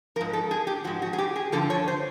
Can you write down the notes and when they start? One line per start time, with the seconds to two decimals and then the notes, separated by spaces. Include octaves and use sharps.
0.16 F3 A#4
0.21 G#2
0.33 A4
0.51 G#4
0.67 G4
0.84 G#2 F3 F#4
1.02 F#4
1.13 G#4
1.18 G4
1.36 G#4
1.52 G2 D3 F3 A4
1.70 C#5
1.88 C5